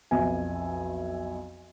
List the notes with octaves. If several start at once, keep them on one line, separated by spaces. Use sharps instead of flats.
B1 F2 E5 G#5